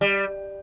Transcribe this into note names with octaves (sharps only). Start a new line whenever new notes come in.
G3